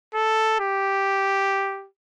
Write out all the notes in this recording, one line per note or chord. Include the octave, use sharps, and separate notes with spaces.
A4
G4